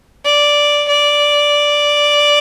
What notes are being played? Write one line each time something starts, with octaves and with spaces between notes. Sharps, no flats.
D5
D5